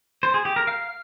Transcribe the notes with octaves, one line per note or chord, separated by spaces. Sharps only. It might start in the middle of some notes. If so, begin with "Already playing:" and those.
C5
G#4
G4
A#4
F5